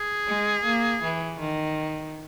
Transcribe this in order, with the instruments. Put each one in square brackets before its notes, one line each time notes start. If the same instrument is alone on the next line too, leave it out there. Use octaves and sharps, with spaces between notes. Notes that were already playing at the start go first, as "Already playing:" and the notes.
Already playing: [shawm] G#4
[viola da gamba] G#3
A#3
E3
D#3